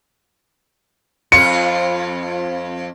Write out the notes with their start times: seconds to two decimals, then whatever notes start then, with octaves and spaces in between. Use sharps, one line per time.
1.32 F2 F4 C#7